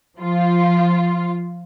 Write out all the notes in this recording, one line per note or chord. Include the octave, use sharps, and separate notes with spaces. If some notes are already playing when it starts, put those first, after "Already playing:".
F3 F4